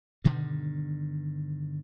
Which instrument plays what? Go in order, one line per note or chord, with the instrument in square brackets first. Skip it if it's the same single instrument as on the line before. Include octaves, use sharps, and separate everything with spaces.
[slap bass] G2 B2 D3 D#3